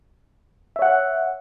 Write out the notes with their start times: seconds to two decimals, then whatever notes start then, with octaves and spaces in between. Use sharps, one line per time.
0.76 E5
0.79 C#5
0.82 F#5